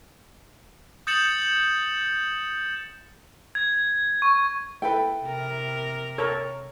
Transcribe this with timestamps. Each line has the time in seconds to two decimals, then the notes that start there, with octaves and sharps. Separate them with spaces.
1.07 D#6 G6 A6 C#7 E7 F#7
3.55 G#6
4.22 C#6
4.82 E4 A4 B4 G5
5.25 C3 A#4
6.18 A4 A#4 C#5